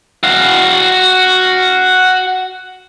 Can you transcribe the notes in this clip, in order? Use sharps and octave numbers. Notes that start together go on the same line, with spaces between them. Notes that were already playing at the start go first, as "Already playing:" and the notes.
F#4 F5